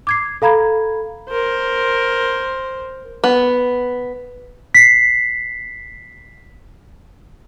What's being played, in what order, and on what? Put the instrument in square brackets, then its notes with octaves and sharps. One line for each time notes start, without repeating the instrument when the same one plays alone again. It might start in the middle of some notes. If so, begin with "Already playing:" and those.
[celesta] D6 G#6 C7
A4 F5 A#5 B5 G#6
[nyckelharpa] A#4 C5
[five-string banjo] B3
[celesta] B6 C7